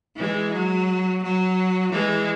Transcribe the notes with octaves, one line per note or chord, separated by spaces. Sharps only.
E3 G#3
F#3
F#3
E3 G#3